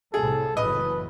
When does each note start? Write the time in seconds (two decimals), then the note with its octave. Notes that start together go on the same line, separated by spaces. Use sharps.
0.14 C2 A2 G#4 A4
0.57 F#1 A2 E3 B4 D#5